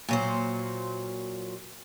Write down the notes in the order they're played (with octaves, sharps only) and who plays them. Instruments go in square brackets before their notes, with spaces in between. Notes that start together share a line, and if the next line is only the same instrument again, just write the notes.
[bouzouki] A#2 F#3 C5